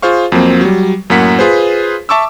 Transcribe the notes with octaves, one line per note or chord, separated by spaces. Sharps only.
F4 G#4 C5 F5 C#6
F2 F#3 A#3 C4
F#3 G3
F#2 A2 A#3 F#5 B6
F4 G#4 B4 C5
E5 A5 C#6 D6 E6